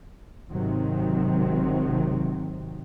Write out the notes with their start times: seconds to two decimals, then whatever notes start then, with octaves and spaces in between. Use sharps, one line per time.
0.51 G#1 C3 D#3 F#3 C4